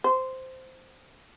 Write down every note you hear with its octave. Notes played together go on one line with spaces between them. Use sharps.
C5